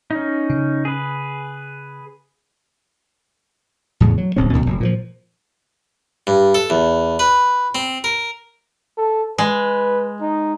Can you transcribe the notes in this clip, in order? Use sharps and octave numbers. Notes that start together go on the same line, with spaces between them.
C#4 D#4
C#3
G#4 B4
E2 A2 C#3
F#3
D1 B1 C4 C#4
D2 B2 D#3
F1 F#2
A#2 E3 F3
G2
A4
E2
B4
C4
A#4
A4
G#3 B4
D#4